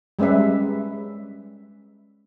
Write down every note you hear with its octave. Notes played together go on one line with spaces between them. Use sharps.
G3 G#3 C#4 B4 E5